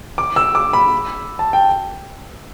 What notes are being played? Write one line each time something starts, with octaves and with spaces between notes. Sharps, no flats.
D6
E6
D6
B5
A5
G5